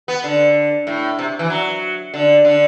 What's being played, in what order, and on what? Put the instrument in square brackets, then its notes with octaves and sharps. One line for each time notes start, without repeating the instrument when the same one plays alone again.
[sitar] B3
D3
A2
C3
E3
F#3
D3
D3